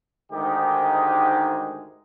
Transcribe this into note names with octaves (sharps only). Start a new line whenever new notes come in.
D2 G#2 D#3 G#3 D#4 G4